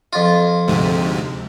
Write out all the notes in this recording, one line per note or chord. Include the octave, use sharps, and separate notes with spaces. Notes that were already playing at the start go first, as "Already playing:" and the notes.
F2 F4
D2 G#2 C3